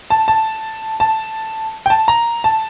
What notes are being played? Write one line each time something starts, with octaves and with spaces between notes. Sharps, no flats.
A5
A5
A5
G5
A5
A#5
A5